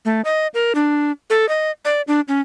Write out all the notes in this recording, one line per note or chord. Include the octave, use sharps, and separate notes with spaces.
A3
D#5
A#4
D4
A4
D#5
D5
D4
C#4